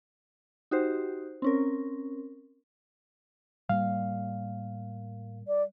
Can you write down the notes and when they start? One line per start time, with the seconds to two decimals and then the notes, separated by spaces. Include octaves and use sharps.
0.71 D#4 F#4 G4 C5
1.42 C4 C#4 A#4
3.69 A2 G3 A#3 F5
5.47 D5